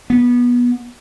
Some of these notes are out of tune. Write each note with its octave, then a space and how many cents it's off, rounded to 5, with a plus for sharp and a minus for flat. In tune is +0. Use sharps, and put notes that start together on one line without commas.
B3 -20